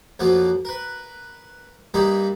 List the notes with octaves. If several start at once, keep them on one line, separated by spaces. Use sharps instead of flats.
F2 F3 F#3 A#3 F4
A#4 B4
G2 G3 A#3 D#4 A#5 B5